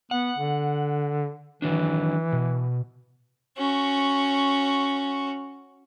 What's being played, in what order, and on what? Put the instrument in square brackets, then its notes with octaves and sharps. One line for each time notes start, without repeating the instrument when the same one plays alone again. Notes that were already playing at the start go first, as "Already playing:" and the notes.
[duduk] B3 [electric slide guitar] F#5
[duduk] D3
[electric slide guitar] D#3 F#3 D4 [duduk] E3
[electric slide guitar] B2
[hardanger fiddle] C#4 F#4